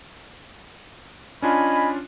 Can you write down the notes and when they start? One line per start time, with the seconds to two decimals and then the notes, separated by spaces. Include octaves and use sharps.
1.42 C#4 D4 F4 D#5 G#5 B5